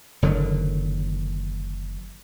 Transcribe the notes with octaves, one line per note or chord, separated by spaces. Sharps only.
F#1 D3 D#3 F#3